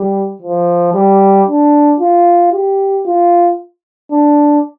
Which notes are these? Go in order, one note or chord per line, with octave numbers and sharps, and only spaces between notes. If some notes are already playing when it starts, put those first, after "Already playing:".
Already playing: G3
F3
G3
D4
F4
G4
F4
D4